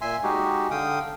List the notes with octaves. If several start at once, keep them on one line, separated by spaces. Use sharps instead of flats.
A#2 E5 G#5 C6
G#3 D#4 F#4 G4
D3 F5 G5 D#6